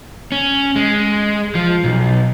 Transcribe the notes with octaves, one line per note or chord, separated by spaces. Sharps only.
C#4
G#3
F3
B1